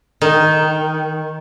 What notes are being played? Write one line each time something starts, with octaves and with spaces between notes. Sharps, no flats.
D#3